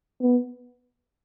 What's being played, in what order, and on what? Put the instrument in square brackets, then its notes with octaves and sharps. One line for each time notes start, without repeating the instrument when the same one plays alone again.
[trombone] B3